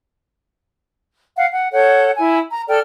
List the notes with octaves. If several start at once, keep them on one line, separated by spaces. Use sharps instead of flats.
F5 F#5
F#5
A4 C#5 F#5 G6
E4 G#5
A#5
A4 D5 G5 F6